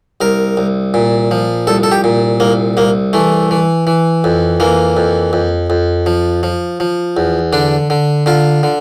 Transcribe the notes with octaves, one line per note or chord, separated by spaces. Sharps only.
C2 A#4
C2
A#2
F3
C2 A4
A4
G4
A#2
C2 A#3
C2 A#3
E3 A3
E3
E3
F2
E3 A#3
F2
F2
F2
F3
F3
F3
E2
D3 D4
D3
D3 F4
D3